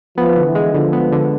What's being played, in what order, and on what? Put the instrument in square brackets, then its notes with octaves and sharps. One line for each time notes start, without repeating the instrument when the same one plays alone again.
[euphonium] F3 [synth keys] B3
[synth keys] D3
[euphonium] E3
[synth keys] G#3
[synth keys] D3 [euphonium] F3
[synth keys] B3
D3